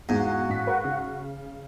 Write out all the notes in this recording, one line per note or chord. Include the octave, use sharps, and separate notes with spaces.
E2 G#2 F#4 F5
A1 B6
A#4 B4
C#3